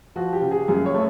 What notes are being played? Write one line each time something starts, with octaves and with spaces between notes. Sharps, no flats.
F3 F#4
G4
C#3
G#4
F#2 G#4
C#5
A3